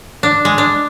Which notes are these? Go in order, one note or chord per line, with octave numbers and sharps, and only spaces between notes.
D4
G#3
D4